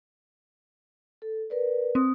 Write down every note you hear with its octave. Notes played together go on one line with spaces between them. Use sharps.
A4
A#4 B4 D5
C4 D#6